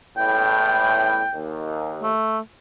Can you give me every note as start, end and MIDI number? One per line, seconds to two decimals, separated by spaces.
0.17 1.24 33
0.17 1.24 40
0.17 1.24 45
0.17 1.42 79
1.34 2.10 39
2.03 2.39 57